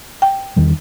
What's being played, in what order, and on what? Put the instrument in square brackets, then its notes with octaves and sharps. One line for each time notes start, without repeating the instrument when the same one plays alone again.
[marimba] G5
[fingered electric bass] E2 D#3 G3